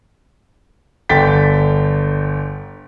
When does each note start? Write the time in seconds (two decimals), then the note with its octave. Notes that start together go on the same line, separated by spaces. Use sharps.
1.09 G1 D3 G5 A6 B6